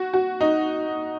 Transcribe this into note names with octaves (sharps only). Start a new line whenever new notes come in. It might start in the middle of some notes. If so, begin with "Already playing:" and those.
Already playing: F#4
F#4
D#4